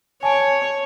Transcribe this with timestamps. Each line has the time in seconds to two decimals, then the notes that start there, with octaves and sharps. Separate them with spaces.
0.23 C#5 G#5 A5 D7